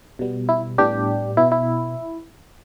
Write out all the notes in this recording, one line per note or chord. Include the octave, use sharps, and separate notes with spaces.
B2 G3 B3
E4
A2 G3 B3 D4 G4
B2 B3 E4
E4